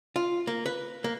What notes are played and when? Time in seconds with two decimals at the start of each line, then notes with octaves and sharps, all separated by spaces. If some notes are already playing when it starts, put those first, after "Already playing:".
0.16 F4
0.47 A#3
0.66 B4
1.04 A#3